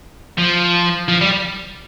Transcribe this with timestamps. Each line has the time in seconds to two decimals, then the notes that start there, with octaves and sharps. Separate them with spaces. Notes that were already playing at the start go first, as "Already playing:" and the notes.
0.38 F3
1.08 F3
1.21 G3